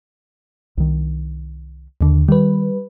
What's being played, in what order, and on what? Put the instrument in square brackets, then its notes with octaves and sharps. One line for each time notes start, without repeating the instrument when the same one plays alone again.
[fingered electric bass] C2 D#3
[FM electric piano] D#2 D3
[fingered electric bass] D#3 [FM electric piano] G3 B4